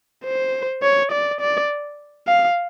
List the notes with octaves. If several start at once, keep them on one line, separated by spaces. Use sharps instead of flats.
C5
C#5
D5
D5
F5